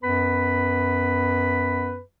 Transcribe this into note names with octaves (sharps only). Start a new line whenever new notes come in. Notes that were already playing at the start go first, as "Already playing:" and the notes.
F#2 B3 B4 B5